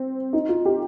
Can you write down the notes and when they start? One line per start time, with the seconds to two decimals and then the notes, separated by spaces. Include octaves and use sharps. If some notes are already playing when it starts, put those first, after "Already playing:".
Already playing: C4
0.33 D#4
0.49 F4
0.66 G4